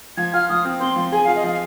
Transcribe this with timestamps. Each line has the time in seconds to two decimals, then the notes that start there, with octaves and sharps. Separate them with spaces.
0.17 F3 G#6
0.33 F4 F6
0.49 F3 D#6
0.65 C4
0.80 C4 C6
0.96 F3
1.12 G#4 G#5
1.24 F4 F5
1.36 D#5
1.44 F3 F5